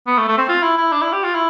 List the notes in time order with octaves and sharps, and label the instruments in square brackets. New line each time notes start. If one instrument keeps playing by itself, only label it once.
[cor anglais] B3
A3
A3
C4
F4
E4
E4
D4
E4
G4
F4
E4